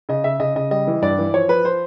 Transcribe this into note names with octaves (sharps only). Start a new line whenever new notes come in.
C#3 D#5
C#3 E5
C#3 D#5
C#3 D#5
G3 D#5
E3
G2 D5
E3
F3 C#5
F3 B4
F3 C5